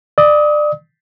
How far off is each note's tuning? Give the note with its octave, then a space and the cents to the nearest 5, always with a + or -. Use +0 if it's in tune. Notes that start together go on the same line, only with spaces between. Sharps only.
D5 +25 D#6 +35